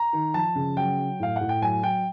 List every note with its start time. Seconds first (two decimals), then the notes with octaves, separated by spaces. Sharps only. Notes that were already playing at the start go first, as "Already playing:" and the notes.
Already playing: A#5
0.13 D#3
0.34 F3 A5
0.55 C#3
0.77 F#3 G5
0.98 F#3
1.20 A2 F5
1.36 F#5
1.41 A2
1.49 G5
1.62 F#3 G#5
1.83 F#3 G5